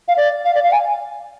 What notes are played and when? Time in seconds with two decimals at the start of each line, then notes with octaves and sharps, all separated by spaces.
0.08 F5
0.17 D5
0.45 F5
0.55 D5
0.64 F5
0.72 G#5